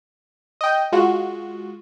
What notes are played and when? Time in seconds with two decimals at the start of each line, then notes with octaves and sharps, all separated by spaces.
0.61 D#5 G5
0.92 G#3 F4 F#4